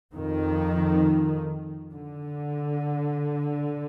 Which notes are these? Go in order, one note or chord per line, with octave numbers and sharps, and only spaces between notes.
F2 D#3
D3